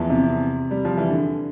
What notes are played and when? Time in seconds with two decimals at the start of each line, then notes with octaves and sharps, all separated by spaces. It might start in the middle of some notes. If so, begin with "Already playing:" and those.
Already playing: E2 E3 F3
0.10 C3
0.71 G3
0.85 F3
0.97 E3
1.10 D3